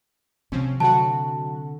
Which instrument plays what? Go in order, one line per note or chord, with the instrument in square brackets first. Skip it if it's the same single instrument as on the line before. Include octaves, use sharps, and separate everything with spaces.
[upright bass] C3 [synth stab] F3 C4 C#4
[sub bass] D3 [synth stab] F#3 F#4 [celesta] A5